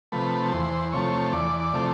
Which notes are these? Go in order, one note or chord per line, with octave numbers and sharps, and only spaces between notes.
C3 F3 A3 B4
E2 C5
C3 F3 A3 C#5
E2 D5
D5
C3 F3 A3